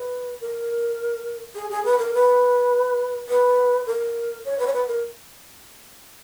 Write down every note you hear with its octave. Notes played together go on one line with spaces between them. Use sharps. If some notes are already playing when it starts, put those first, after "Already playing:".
Already playing: B4
A#4
G#4
G#4
B4
A#4
B4
B4
A#4
C#5
B4
C#5
B4
A#4